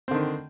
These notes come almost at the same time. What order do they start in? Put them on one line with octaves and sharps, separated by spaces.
C4 D3 D#3